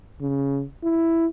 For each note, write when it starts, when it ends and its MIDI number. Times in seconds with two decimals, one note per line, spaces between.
0.21 0.64 49
0.84 1.26 64